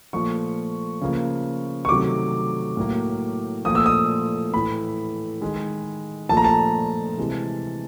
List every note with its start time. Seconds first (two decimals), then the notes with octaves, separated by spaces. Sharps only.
0.13 A#2 F3 A3 C#6
1.01 C#3 F3 A#3
1.85 C#6
1.89 C3 D#3 F#3 A3 D6
2.77 A2 F#3 A#3
3.65 A#2 F3 A3 D#6
3.75 E6
3.86 D#6
4.54 A2 E3 A3 B5
5.41 D#3 G#3
6.29 A#2 F3 A3 A5
6.37 A#5
6.44 A5
7.17 C3 E3 G#3